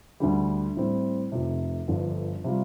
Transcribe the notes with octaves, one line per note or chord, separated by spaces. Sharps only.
D2 D3 G3
A2 G3 C4
F1 F2 C3
G1 G2 D3 F3
C3 G3 F4